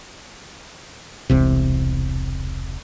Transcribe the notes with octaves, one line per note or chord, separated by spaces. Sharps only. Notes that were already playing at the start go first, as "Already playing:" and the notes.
E1 C2 C3